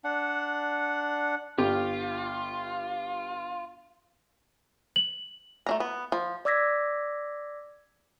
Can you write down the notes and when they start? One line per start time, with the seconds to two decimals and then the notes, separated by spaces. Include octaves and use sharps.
0.04 D4 F#5
1.58 G1 F4 G4
4.96 F#7
5.66 A3 D4 A#5
5.80 B3
6.12 F3
6.45 D5 D6 E6 G#6 A#6 B6